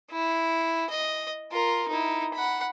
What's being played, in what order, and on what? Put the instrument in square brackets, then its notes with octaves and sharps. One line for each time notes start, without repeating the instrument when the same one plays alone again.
[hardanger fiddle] E4
D#5
F4 A#4
D#4 E4
F#5 B5